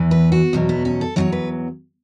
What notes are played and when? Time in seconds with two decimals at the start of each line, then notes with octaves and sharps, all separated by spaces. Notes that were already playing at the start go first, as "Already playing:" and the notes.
Already playing: E2 E3
0.11 B4
0.32 F#4
0.53 E2 B2 F#3
0.69 B3
0.85 C#4
1.01 A4
1.16 E2 B2 F#3 C#5
1.32 B4